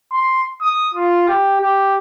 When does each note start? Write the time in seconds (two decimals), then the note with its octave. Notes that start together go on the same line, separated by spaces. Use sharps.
0.13 C6
0.61 D#6
0.94 F4
1.28 G4
1.61 G4